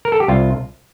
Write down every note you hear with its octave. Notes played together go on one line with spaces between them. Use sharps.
A#4
A4
G4
C2 F4